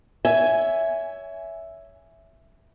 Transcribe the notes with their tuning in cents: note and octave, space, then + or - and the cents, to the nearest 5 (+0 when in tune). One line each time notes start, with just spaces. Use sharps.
C#5 +25 E5 +0 G#5 +0